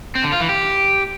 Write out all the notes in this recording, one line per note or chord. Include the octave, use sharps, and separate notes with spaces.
C4
D3
F4
E3
G4